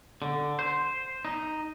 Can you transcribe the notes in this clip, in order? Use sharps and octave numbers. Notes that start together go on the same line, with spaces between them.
D3
C5
D#4